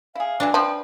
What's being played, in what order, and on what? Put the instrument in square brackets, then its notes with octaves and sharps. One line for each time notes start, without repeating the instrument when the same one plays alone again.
[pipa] E4 G#4 [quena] F5
[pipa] D3 E3 F#3 [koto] D4
[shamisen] F3 [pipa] F4 B4 [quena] G5